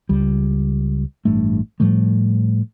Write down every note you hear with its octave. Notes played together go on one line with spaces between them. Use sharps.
C#2 G3
A1 G2 A3
A2 F3 G3 A3